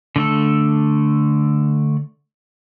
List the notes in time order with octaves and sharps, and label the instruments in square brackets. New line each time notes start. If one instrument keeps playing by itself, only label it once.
[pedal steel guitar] D3 A3 A4